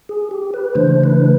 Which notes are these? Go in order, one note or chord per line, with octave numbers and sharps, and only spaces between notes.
G#4
G4
B4
C#3 E3 A3 D4 C5
B4